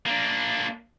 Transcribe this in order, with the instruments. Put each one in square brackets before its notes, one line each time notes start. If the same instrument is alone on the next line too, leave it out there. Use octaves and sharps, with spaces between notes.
[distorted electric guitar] A#3 D4